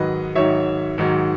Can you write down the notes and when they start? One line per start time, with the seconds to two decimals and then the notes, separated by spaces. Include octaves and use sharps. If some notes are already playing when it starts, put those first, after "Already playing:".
Already playing: G#2 D#3 F#3 B4 D#5
0.35 G#2 D#3 F#3 C#5 E5
0.98 G#2 D#3 F#3